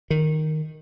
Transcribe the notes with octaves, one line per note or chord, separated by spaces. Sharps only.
D#3